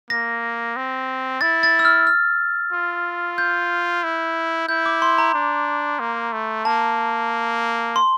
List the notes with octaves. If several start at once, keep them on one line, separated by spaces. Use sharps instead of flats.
A#3 A#6
C4
E4 A6
A6
E6
F6
F6
F4
G6
E4
E4 G6
D6
C6
A#5
D4
A#3
A3
A#3 A5
C6